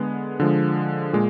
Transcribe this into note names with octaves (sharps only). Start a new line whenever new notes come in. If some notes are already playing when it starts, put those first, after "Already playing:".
Already playing: D3 G#3 B3
D3 F3 G#3
A#2 G#3